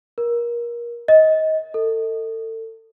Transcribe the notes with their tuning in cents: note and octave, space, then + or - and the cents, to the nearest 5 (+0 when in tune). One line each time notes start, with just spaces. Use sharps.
A#4 +25
D#5 +20
A4 +30